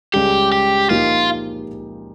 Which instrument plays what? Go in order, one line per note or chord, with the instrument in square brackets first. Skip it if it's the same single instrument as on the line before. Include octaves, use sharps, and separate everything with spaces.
[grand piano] C#2 C#3 G3 [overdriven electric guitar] G4
[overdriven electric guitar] G4
[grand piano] A#2 F3 A#3 D#4 G4 [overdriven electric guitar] F4